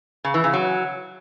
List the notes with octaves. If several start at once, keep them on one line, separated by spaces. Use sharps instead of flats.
C#3
E3
C#3
F#3